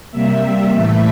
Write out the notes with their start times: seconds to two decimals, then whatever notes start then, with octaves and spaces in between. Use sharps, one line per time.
0.12 C3 G3 A#3 E5
0.71 A2 E3 A3 E5